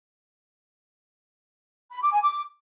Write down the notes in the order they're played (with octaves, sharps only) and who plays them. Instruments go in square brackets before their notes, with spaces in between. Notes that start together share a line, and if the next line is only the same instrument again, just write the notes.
[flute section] B5
D6
G#5
D6